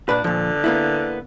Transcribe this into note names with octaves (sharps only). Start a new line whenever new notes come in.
A#2 D4 B4
A#2 D3 F3
A#3 B3 E4